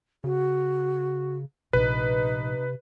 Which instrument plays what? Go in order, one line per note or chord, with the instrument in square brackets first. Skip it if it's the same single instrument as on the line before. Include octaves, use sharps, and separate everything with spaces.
[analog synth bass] C#3 [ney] F#4
[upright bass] A#1 [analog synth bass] C3 [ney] D#4 [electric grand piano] B4